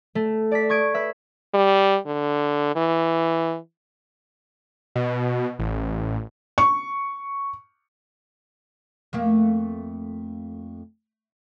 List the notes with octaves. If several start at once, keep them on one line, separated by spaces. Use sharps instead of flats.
A3
D5 A5 B6
C#6 D#6 G#6 D7
B4 E5
G3
D3
E3
B2
A1
C#6
F2 A3 A#3